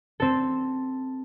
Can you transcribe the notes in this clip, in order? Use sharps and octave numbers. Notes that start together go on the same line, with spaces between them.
C4 A4